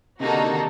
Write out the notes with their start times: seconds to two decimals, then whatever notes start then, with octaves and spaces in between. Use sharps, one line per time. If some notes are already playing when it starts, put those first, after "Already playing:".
0.20 C3 A#3 D#4 F#4 A4
0.32 D3
0.44 D#3